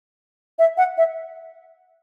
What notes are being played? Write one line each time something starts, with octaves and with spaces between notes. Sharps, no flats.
E5
F#5
E5